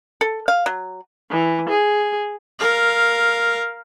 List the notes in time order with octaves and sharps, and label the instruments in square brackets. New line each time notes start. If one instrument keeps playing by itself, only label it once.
[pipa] A4
F5
F#3
[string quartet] E3
G#4
[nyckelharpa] A#4 F5